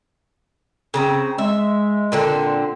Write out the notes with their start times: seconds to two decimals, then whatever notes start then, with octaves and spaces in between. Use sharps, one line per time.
0.94 C#3 C4 A#5
1.38 G#3 E5
2.12 A#2 D3 C4